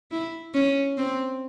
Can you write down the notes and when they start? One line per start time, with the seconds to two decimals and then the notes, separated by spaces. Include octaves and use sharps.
0.12 E4
0.54 C#4
0.97 C4